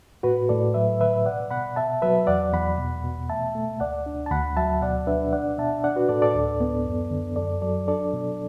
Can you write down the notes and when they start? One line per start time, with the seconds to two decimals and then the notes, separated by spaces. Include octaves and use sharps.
0.23 A2 F#4 B4
0.49 A2 A4 D5
0.74 F#3 B4 E5
1.00 D3 B4 E5
1.26 B2 D5 F#5
1.51 B2 F#5 B5
1.76 B2 E5 A5
2.02 F#3 B4 E5
2.27 E2 D5 F#5
2.52 E2 F#5 B5
2.78 B2
3.04 B2
3.29 A3 E5 A5
3.55 A3
3.80 D2 D5 F#5
4.06 D4
4.26 A5
4.31 D2 F#5 B5
4.57 F#3 E5 A5
4.82 B2 D5 F#5
5.07 D4 B4 E5
5.33 D4 D5 F#5
5.58 B2 E5 A5
5.84 D4 D5 F#5
5.96 F#4 B4
6.09 A2 A4 D5
6.22 A4 D5
6.35 D2
6.60 B3
6.85 F#2
7.10 D3
7.36 F#2 A4 D5
7.61 F#3 A4 D5
7.87 D4 A4 D5
8.13 B2